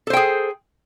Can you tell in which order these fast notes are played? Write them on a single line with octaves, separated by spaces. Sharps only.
A4 C5 G5 G#4